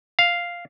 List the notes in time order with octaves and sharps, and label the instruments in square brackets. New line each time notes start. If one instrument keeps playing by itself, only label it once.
[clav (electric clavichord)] F5